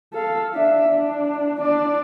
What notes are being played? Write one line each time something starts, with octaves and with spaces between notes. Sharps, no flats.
A4 F5
D4 E5
D4
D4 D5